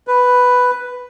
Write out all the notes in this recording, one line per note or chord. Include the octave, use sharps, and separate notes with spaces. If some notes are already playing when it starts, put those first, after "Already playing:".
B4